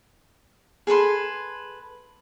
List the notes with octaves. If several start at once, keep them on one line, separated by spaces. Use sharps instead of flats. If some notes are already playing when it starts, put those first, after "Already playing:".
G#4 A4 B4 C6